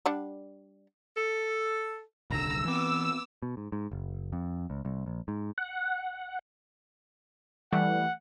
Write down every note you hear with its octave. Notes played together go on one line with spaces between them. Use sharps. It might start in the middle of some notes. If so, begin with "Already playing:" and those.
G3 D4 F#5
A4
D#1 C2 D3 A#5 E6
E3 B3 C4 D6
B2
G#2
G#2
F#1
F2
C#2
C2
A#1
G#2
F#5
E3 G3 A3 F#5